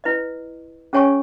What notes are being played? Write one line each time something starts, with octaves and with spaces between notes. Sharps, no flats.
E4 B4 D#5
C#4 G#4 C#5 G#5 C#6